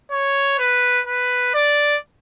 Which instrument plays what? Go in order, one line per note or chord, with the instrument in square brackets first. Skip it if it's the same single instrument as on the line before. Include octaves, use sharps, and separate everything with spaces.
[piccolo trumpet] C#5
B4
B4
D5